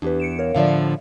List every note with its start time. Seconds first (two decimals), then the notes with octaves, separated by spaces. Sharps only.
0.02 E2 D4 G4 B4
0.20 C#7 D7 E7
0.39 A#4 C#5 F5
0.55 A2 D3 F3 D5 E5 F5